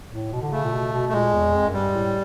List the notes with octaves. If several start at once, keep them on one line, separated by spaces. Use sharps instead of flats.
A2
B2
D3
C#3 A3
A#2
B2
B2
A3
A#2 G#3
E2
F2
F#2
G2 G3
A2